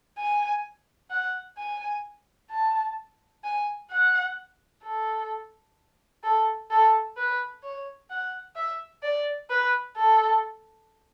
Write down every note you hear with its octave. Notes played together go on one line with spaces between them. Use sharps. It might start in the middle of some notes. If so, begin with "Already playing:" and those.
G#5
F#5
G#5
A5
G#5
F#5
A4
A4
A4
B4
C#5
F#5
E5
D5
B4
A4